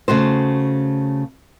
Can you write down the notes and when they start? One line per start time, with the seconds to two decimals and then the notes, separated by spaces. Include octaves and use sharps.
0.08 C#3 A3 F#4 C5